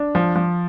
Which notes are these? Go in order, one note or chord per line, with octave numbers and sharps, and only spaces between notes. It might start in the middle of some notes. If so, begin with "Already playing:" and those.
Already playing: D4
F3
F3